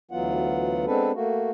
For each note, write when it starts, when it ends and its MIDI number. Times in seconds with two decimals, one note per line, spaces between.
0.11 0.85 38
0.11 0.85 52
0.11 0.85 54
0.11 0.85 59
0.11 0.85 65
0.11 0.85 78
0.86 1.12 56
0.86 1.12 59
0.86 1.12 60
0.86 1.12 62
0.86 1.12 69
0.86 1.12 71
1.15 1.51 57
1.15 1.51 58
1.15 1.51 66